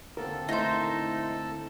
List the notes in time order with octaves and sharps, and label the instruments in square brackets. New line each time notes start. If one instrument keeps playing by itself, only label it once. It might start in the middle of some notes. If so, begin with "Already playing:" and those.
[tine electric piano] D3 A#3 C4 [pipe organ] A4 [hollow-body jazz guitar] A#4
[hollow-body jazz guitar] A3 E4 [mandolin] D#4 C5